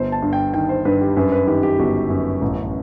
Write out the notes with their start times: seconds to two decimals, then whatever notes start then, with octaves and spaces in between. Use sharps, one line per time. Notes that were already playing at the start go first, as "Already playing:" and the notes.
Already playing: G1 C5
0.12 A5
0.22 G2
0.33 G5
0.54 D#3 G5
0.69 C5
0.85 G2 B4
1.01 G4
1.16 F#2 B4
1.32 B4
1.47 D#3 G4
1.63 G4
1.79 G1 F#4
2.10 F#2
2.42 A1